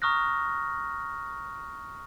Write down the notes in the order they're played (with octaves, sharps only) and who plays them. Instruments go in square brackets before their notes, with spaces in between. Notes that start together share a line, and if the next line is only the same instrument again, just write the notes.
[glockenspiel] A#5 C#6 D#6 F6 F#6 A#6